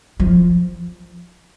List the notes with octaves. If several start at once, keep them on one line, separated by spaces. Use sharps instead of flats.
F3